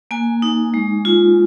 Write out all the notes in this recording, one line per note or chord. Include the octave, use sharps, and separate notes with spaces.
A#3 G#5
D#4
G#3
F4